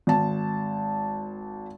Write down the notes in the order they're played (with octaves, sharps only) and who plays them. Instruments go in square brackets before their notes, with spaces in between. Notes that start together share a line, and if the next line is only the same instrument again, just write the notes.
[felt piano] G#1 A5